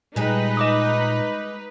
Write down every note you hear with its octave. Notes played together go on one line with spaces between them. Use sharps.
A#2 G3 G#3 D#4 B4
D#5 D6 D#6